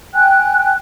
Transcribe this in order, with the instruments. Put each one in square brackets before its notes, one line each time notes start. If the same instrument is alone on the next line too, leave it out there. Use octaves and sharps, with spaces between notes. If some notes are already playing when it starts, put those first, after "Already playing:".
[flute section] G5 G#5 F#6